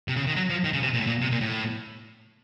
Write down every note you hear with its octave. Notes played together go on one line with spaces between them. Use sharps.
C3
C#3
D#3
F#3
F3
D#3
C#3
C3
A#2
A2
A#2
C3
A#2
A2